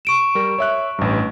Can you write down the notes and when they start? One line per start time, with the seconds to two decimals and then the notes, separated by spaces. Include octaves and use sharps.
0.05 C#6 D7 E7
0.35 G3 A#4
0.59 C#5 E5 F#6
0.99 A1 G2